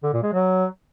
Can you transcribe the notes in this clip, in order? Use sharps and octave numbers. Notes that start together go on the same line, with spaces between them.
D3
A#2
G#3
F#3